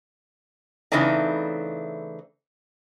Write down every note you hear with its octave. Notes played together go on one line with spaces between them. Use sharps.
C#3 E3 A3 C4 D4 D#4